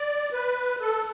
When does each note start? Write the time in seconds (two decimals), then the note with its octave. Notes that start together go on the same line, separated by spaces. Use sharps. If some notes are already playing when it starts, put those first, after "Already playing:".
Already playing: D5
0.33 B4
0.81 A4